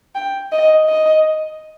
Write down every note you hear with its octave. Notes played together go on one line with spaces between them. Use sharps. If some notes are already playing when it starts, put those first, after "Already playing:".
G5
D#5
D#5